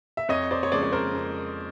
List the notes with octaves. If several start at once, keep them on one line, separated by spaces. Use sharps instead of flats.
E5
F2 C#5 D#5
C5 D5
C#5
C#3 F3 G#3 C5 D5
C#5
A#4 C5
F2